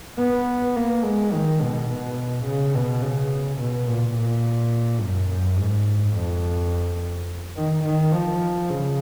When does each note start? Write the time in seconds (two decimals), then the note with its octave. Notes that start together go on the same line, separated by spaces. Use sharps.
0.19 B3
0.76 A#3
1.04 G#3
1.33 D#3
1.61 B2
1.89 B2
2.46 C#3
2.75 B2
3.02 C#3
3.60 B2
3.87 A#2
4.16 A#2
5.01 F#2
5.30 F#2
5.58 G#2
6.14 F2
7.56 D#3
7.85 D#3
8.12 F3
8.70 C#3